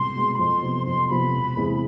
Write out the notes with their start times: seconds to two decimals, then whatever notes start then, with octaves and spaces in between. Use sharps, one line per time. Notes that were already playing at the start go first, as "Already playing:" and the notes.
Already playing: C2 B2 G#3 B3 C6
0.15 B2 G#3 B3
0.34 B5
0.39 F2 C6
0.62 C3 F3 B3
0.86 F2 C6
1.09 C3 F3 B3 B5
1.33 E1
1.57 E2 C3 E3 G#3